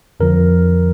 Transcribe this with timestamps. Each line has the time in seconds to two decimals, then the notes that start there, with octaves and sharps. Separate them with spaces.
0.20 F2 D3 F3 A#4